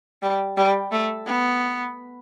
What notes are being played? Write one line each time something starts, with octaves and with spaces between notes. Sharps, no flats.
G3
G3
A3
B3